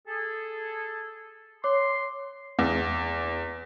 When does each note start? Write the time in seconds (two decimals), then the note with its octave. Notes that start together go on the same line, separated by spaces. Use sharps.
0.08 G#4 A4
1.64 C#5 C6 D6
2.59 E2